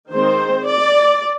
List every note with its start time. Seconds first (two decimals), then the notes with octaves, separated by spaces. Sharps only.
0.11 D#3 G#3 C4 C5
0.66 D5